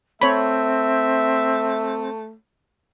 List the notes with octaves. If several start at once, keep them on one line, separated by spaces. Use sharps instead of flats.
A3 C4 C#5 E5 B5